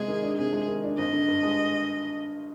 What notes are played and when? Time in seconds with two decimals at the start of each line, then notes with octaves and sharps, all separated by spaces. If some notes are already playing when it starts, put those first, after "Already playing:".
Already playing: C3 G#3 G#4
0.08 D#3
0.23 D4
0.38 C3 G#4
0.53 G#3
0.68 D#3
0.83 D4
0.98 G#1 D#5
1.13 D3
1.28 G2
1.43 G#3